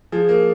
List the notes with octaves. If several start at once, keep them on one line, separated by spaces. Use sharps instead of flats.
F3 G#4
A#3